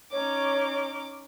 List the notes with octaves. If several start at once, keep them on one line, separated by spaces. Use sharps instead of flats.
C#4 D#4 C#5 D6